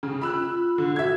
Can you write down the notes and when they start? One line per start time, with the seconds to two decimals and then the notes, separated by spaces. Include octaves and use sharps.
0.03 C#3
0.21 F4 B5 E6 F#6
0.38 F4
0.78 D3
0.96 F#4 E5 G#6